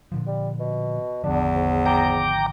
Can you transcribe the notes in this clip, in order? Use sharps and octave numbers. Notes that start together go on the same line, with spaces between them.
A#2 D3 F3
G3
B2
G#1 E2 D3 F3 D4
G#2
G5 A#5 D6